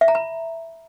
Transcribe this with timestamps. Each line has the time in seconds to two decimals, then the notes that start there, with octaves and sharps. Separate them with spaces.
0.01 E5
0.08 A#5
0.15 B5